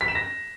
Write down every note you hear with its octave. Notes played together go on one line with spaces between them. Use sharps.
B6
E7
A#6